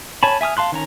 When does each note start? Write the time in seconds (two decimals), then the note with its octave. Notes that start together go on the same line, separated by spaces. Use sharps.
0.23 C#5 G#5 A5 B5
0.41 E5 G#5 D#6 F6
0.57 F5 A5 C6 F#6
0.72 D#3 C#4 A#5